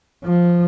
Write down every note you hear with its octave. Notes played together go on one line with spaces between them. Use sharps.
F3